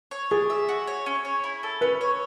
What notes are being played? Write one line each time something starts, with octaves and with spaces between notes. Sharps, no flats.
C#5
D4 G#4
E5
F#4
C#5
C#4
C#5
E4
A4
C#4 B4
C#5